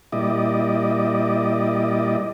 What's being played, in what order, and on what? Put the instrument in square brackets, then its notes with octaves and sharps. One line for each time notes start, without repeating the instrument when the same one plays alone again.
[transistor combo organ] A#2 G3 E4 D5 D#5